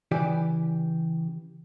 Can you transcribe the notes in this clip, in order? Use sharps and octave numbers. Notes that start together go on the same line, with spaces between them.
C#3 E3 G4 D5